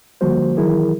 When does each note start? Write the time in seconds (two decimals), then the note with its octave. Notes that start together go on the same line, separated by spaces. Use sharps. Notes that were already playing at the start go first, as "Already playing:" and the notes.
0.21 D3 F3 G3 A#3 F#4 C5
0.57 D#3 E3 F#3 E4 G#4 A#4